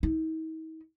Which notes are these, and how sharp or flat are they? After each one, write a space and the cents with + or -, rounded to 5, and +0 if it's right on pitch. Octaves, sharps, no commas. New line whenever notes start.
D#4 +45